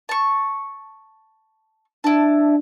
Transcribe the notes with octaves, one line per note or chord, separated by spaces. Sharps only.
A5 C#6
D4 E4 A5